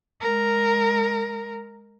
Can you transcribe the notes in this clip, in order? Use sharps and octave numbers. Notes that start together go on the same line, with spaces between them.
G#3 A#4